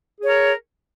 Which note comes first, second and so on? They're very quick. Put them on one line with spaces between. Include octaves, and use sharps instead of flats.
G#4 C#5 A#4